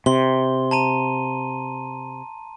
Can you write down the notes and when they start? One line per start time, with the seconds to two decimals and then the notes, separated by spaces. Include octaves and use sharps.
0.06 C3 C6 G7
0.71 A5 A#5 D#7